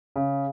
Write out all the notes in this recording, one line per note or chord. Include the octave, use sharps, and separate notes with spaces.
C#3